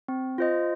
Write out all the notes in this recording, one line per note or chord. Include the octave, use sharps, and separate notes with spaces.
C4
F4 C5 D#5